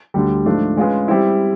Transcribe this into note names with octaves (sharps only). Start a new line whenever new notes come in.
D2 D3 G3
G#2 F3 A3 D4 F4
G#3 C#4 F4 G#4 B4
G3 C4 E4